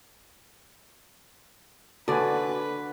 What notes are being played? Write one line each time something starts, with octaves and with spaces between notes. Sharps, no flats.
D3 F#4 B4 D5 G#5